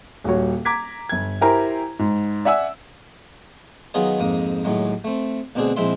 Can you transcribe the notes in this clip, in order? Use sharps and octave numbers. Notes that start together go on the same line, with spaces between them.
D#1 G3 F#4 C#5
A#5 D6 G#6 B6
G1 G#6
E4 G4 A#4 C5 G#5 A#5
G#2
D5 E5 F#5 G#5 E6
D#3 F#3 B3 F4 G#4 D#5
F2 G#2 A#3 D#6
D#2 A2 F#3 G#3
A3 C4
D2 B2 C4 D4 G#4
A#1 G#3 C4 E4 E5 C6